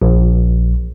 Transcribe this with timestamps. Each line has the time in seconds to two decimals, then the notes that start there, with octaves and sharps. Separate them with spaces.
0.02 A#1